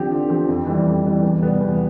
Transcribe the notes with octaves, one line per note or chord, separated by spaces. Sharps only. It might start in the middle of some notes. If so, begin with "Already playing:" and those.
Already playing: D3 F3 C4 G4
D3
F3 C4 G4
F2
E3 G3
F2
E3 G3
E2
C3 G3 B3
E2